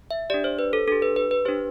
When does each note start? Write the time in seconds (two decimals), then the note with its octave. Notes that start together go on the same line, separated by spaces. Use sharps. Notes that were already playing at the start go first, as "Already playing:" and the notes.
0.11 E5
0.30 D4 G4 D5
0.44 C5
0.59 B4
0.73 A4
0.87 D4 G4 A4
1.02 B4
1.16 B4
1.31 B4
1.45 D4 G4 C5